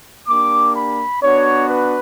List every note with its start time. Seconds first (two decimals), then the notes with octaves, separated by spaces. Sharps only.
0.28 A#3 D4 G4 D6
0.76 B5
1.23 B3 D4 F#4 C#5
1.69 B4